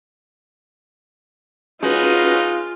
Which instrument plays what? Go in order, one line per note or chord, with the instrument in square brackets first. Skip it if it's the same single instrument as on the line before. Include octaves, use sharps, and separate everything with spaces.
[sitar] G#3 [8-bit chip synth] C#4 F#4 B4 [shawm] D#4 [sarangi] F4